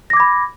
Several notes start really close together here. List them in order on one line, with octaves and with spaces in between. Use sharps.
A#6 D6 G#6 B5